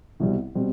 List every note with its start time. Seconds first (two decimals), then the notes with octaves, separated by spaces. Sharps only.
0.20 C2 B2 G3 C4
0.55 B2 G3 C4